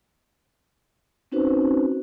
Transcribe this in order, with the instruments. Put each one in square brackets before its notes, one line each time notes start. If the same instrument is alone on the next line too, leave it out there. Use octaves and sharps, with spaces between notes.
[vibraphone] C4 C#4 D#4 F#4 B4 C5